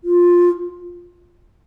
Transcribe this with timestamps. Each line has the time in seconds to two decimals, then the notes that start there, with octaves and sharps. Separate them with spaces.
0.04 F4